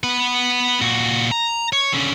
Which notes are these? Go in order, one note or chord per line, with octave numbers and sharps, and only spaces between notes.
B3 B4
A#2 F#4
A#5
C#5
D3 C#4